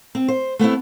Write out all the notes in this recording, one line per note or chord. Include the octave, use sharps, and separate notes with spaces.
C4
C5
A3 B3 C4 E4